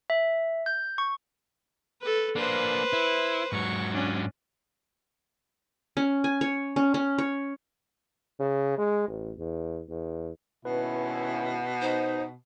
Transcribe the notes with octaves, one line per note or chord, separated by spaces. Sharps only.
E5
G6
C#6
A4 B4
A#3 D4 B4 C5
E4
G#2 F#3 C#6
C#4 D4
C#4
G#5
C#5
C#4
C#4
C#5
C#3
G#3
A1
E2
E2
G#1 B2 C#4 E4 B4
D#4 C5